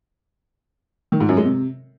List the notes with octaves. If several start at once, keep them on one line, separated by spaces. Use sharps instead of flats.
D#3
G#2
F#2
G#3
C3